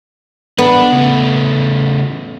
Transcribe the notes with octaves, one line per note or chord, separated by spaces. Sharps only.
B3 D4
C#3 A3